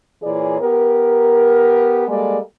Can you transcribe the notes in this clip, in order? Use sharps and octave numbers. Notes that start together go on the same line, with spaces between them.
A#2 E3 G#4 C#5 D5
B3 G4 A#4
G3 G#3 A#3 A4 D5